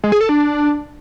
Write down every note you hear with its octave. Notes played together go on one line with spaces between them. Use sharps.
G#3
G#4
A4
D4